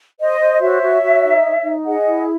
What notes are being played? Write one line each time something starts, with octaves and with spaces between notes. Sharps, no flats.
C5 D#5
C5
F#4 C#5 E5
F#4
F#4
D#4
C#5
D#4
G#4 D#5 F#5
E4